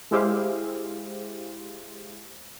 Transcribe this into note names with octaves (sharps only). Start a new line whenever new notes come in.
G#3 E4 G4 G#4 C5 F5